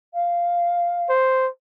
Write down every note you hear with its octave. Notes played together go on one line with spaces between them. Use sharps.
F5
C5